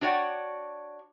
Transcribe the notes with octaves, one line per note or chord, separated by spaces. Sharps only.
D4 F#4 C#5 D5 F#5 G5